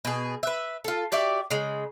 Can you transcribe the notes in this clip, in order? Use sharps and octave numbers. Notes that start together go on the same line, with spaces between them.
B2 G#4
B4 E5
F4 A4
F#4 G4 D5 E5
C#3 G#3